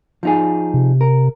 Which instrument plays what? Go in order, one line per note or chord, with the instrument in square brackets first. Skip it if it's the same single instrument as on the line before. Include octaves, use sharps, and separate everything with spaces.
[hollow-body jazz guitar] F3 D#4 G#4
[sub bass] C3
[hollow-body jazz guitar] A#4